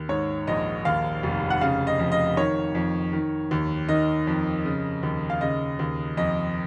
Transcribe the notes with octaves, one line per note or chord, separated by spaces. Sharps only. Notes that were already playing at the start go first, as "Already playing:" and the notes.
Already playing: D#2
G#2 C#5
A#1 D#5
D#2 F5
F1
F#5
C#3 F5
D#5
F2
D#5
D#3 C#5
F2
D#3
D#2
D#3 D#5
F2
C#3
D#2
F5
C#3 D#5
D#2
F2 D#5